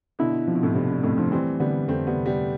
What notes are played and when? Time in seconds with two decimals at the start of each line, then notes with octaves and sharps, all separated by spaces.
0.19 B2 D3 E4
0.47 C3 F3
0.55 B2
0.63 A2 C3
0.75 G2 C3
0.90 G2
1.03 F2 A2 A3
1.18 D3 F3
1.32 E3 G3 C4
1.60 D3 G3 B3
1.88 F2 A3 C4
2.07 G3 B3
2.17 C3
2.26 G3 B3